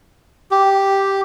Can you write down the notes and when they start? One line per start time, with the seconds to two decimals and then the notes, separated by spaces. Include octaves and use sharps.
0.51 G4